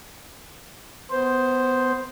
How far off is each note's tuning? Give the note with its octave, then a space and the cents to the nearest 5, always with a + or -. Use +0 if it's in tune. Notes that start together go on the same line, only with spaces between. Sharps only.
B3 +20 C5 +0